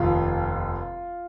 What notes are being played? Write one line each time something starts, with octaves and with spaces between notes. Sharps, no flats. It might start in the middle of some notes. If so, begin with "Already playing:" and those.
Already playing: F1 D#2 D#3 F4